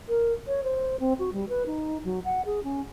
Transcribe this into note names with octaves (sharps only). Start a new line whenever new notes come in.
A#4
C#5
C5
C4
F#4
G3
B4
D#4
F#3
F#5
G#4
C#4